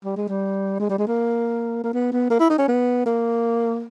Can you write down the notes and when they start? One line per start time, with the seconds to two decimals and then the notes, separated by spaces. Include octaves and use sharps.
0.05 G3
0.16 G#3
0.29 G3
0.80 G#3
0.90 G3
0.99 G#3
1.08 A#3
1.84 A#3
1.94 B3
2.12 B3
2.30 A#3
2.40 E4
2.50 D#4
2.58 C#4
2.68 B3
3.06 A#3